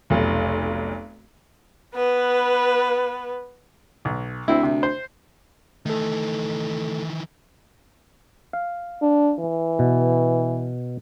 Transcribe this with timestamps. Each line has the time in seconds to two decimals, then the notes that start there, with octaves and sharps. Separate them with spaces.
0.10 F1 B1
1.95 B3 B4
4.05 B1
4.48 D2 C4 E4
4.63 C3
4.83 C5
5.86 D#3 E3 A3 A4
8.53 F5
9.02 D4
9.39 E3
9.79 B2